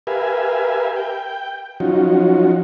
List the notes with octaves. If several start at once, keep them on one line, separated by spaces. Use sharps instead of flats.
G4 A#4 B4 E5 F5 G#5
G5
F3 F#3 C#4 D#4 F4 F#4